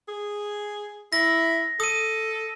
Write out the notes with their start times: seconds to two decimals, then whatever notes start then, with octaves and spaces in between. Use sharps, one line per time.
0.08 G#4
1.13 E4 A#6
1.80 A4 D#6 D#7